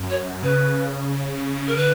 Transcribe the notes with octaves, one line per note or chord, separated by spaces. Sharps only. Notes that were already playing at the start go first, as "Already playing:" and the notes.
Already playing: F#2
C#5
C#3 B4
A#4
D3 B4